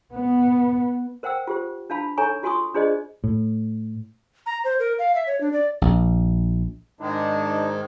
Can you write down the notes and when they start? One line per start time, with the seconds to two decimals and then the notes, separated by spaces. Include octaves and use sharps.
0.14 B3
1.23 A#4 C5 F#5 G5 E6
1.47 F4 G4 C5
1.90 D4 E4 F5 A5 B5
2.18 D#4 A4 C#5 G#5 A#5 C#6
2.43 F4 F#4 G#5 C6 C#6 D#6
2.74 D4 F4 G#4 C5 D5 D#5
3.24 A2
4.46 A#5
4.64 C5
4.79 A#4
4.99 F5
5.15 E5
5.27 C#5
5.41 D4
5.53 D5
5.82 A#1
7.00 G#2 D#3 G#3 D4 D#4